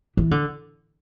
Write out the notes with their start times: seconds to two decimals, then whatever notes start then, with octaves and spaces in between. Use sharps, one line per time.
0.17 E3
0.31 D3